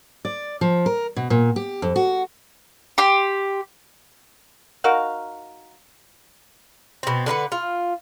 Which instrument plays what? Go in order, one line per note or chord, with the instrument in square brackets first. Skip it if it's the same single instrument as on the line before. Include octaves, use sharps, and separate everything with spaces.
[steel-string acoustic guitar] D5
F3
A#4
B2
A#2
G4
F2
F#4
[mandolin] G4 C6
[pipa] D#4 F#4 A#4 F5
[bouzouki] B2 C4
D3 D4 B4 F#5
F4